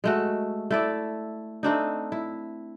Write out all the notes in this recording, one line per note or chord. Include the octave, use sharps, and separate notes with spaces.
G#3 A3 F#4
A3 E4 D5
A3 C4 D4 D#4
E4